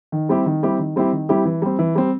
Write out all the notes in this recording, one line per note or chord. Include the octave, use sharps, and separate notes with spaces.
D#3
G3 C4 E4 G4
D#3
G3 C4 E4 G4
D#3
G3 C4 E4 G4
D#3
G3 C4 E4 G4
E3
G3 C4
E3
G3 C4